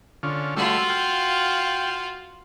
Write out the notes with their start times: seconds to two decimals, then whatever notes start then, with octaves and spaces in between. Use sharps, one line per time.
0.23 D3 C#4 F4
0.56 G3 A3 F4 F#4 E6
0.89 F5 G5